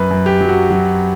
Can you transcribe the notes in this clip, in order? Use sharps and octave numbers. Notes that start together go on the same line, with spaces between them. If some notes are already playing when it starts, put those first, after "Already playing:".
Already playing: F#2 B4
F#2
G4
F#3
F#4
F#3